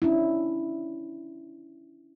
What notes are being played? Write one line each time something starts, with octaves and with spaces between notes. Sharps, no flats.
C#4 D4 E4